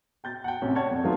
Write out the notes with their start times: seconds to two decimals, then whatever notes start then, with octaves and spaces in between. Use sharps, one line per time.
0.24 G5 G6 A6
0.44 F#5 G5
0.62 A1 C3 C#4
0.75 C#5 D5 F#5 A5 G#6
0.91 F2
1.04 F3 F#3 A3 B3 D#4 F4